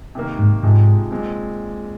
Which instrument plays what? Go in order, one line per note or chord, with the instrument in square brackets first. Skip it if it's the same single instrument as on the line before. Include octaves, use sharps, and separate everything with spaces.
[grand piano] C3 D#3 A#3
[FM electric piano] G#2
[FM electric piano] G#2 [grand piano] C3 F3 G#3 D#4
[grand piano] A#2 G#3 C4